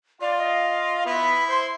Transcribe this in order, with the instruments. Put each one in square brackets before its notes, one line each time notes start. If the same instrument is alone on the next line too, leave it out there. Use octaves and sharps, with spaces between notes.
[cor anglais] F4 [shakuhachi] D5 [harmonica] F5
[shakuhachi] D#5
[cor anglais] B3 [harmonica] E4 [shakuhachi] B5
[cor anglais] C5 [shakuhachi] C6